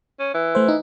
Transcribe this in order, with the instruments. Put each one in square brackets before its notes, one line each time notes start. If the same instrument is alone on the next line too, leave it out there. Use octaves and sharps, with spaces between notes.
[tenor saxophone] C#4
E3
[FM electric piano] A3 C5
D#4